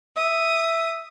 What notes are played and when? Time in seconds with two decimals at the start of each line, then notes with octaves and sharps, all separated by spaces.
0.17 E5 D#6